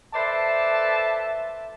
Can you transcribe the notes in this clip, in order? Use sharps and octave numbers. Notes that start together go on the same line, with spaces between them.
A4 B4 C5 D5 E5 A5